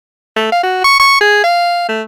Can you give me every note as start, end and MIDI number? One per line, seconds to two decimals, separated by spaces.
0.36 0.51 57
0.52 0.59 77
0.63 0.80 66
0.84 0.99 85
0.99 1.16 85
1.21 1.42 68
1.44 1.89 77
1.89 2.02 57